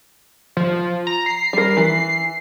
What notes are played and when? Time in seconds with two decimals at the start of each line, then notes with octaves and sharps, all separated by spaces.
0.57 F3
1.07 A#5
1.26 C7
1.53 G3 A#4
1.77 E3